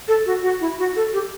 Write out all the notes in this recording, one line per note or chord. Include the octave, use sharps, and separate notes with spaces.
A4
F#4
F#4
E4
F#4
A4
G4